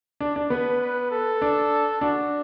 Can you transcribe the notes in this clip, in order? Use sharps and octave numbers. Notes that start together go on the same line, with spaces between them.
D4
D4
B3 B4
B4
A4
D4
D4 F#4